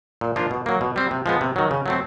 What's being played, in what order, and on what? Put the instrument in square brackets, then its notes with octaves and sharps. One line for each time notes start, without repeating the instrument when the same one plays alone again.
[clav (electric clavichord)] A#2
F3 A#3 D4 F4
B2
F#3 A#3
B2
G3 C4
C3
F3 G#3 B3
C3
D#3 F#3
C#3
F#3 A3 C4